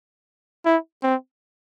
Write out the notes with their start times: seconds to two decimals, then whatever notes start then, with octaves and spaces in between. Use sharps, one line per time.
0.65 E4
1.03 C4